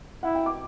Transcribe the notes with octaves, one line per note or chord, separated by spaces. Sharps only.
E4 F#5
G5
D6